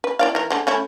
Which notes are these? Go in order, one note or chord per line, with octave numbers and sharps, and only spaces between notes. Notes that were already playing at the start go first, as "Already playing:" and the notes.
B4
E4 D5 F5
E3 A#4
D3 G#3
A3 C#4 E4